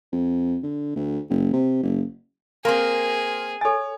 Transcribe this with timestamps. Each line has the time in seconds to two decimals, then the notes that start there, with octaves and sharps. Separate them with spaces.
0.12 F2
0.63 D3
0.96 D2
1.30 F#1
1.53 C3
1.83 F#1
2.65 A#3 C4 G#4 A#4 C6
3.61 A4 C#5 G#5 A6